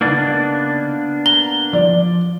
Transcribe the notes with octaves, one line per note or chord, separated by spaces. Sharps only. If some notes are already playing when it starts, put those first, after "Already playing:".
C#3 A#3 B3 D4 D#4
A#5 G7
F3 D5